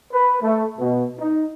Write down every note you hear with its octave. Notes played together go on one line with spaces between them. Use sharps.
B4
A3
B2
D#4